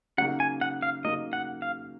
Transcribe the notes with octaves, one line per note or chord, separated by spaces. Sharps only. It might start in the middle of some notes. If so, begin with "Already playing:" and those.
C#3 F#3 A#3 D#4 F#5
G#5
F#5
F5
C#3 F#3 A#3 D#4 D#5
F#5
F5